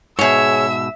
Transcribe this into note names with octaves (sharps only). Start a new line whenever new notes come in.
G#2 B2 G#4 C#5 E5 E6